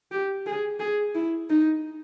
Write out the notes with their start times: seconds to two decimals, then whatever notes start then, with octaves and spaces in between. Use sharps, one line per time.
0.12 G4
0.46 G#4
0.80 G#4
1.15 E4
1.50 D#4